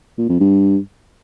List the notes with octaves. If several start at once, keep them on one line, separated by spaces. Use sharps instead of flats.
A#2
F2
G2